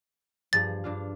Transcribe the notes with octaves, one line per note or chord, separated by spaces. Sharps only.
G2 F3 G#4 A6
G2 D4 F4